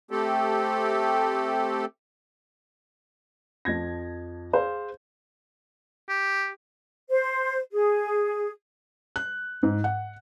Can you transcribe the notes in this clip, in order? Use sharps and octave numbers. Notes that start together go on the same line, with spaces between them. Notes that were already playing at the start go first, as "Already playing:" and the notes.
A3 C4 G4 A4
F2 F3 G#6 A#6
G#4 C5 F5
G4
C5
G#4
F#6
G#2
F#5